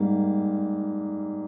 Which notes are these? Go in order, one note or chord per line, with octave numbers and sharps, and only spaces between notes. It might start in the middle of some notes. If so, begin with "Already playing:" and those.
Already playing: G#2 G3 A#3